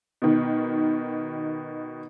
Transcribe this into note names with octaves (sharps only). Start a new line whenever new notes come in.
B2 D#3